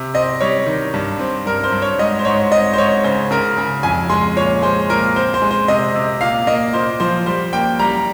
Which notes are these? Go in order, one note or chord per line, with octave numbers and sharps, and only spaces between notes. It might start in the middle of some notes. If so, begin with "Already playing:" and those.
Already playing: C3
C4 D#5
G3 C#5
D#3
G2
C4
G2 A#4
C5
G2
C#5
G#2 D#5
C5
G#2 C#5
C4 D#5
C5
G#2 C#5
C#3 C5
C#3 A#4
C#3
F2 G#5
G#3 C6
A#2 C#5
G#3 C5
A#2 A#4
C4 C5
C5
G#3
C5
C3 D#5
C3
A#2 F5
A#3 D#5
A#2 C5
F3 C5
G3 C5
A#3 G5
G3 A#5